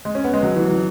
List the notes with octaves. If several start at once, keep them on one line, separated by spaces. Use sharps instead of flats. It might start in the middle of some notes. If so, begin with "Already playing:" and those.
G#3
C#4
B3
G#3
F#3
E3
F#3